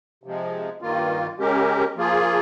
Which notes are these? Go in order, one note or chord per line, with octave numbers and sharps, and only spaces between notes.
C3 F3 G#3
G2 D#3 A#3 F4
C#3 G#3 C#4 G4 A#4
F3 A#3 F4 G#4